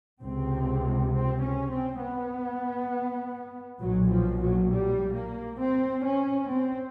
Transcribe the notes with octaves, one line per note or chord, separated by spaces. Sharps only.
C#2 C3 C4
C4
C#4
C4
B3
B1 A#2 F#3
F3
F#3
G3
A#3
C4
C#4
C4